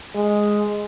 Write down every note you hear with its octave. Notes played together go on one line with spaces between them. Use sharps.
G#3